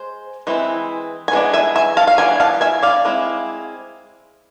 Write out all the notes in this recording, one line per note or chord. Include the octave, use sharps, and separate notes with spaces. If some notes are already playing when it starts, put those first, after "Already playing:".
Already playing: G#3 C5
E3 G#3 C4 E4
G#5
E3 G#3 B3 D4
E5 G#5
E5 G#5
F5 A5
F5
E3 B3 D4 G#5
F5 A5
E5 G#5
D5 F5
G#3 C4 E4